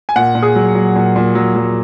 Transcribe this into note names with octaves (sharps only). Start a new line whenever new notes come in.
G#5
A#2 F#5
A#2
G#4
F#3
F#3
A#2
A#2
F#3
F#3